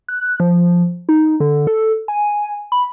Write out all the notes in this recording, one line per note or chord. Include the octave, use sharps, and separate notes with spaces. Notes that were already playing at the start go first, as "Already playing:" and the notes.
F#6
F3
D#4
D3
A4
G#5
B5